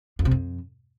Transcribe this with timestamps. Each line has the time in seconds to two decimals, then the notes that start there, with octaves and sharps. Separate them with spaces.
0.19 F2
0.25 C3
0.31 F2